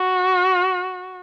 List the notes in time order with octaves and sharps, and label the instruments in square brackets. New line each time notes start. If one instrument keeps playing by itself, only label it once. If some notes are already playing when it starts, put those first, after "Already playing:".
Already playing: [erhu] F#4